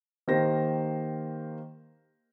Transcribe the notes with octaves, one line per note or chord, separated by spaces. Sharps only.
D#3 A#3 G4 C5 A#6